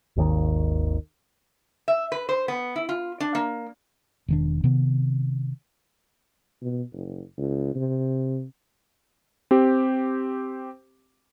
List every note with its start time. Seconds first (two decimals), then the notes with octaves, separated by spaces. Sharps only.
0.16 G#1 D#2 D#3
1.88 E5
2.12 B4
2.29 C5
2.48 B3
2.76 E4
2.89 F4
3.20 D4
3.35 A#3
4.28 E1 D#3 D4
4.64 C3 D#3 B3
6.62 B2
6.93 F#1
7.38 C#2
7.75 C3
9.51 C4 G4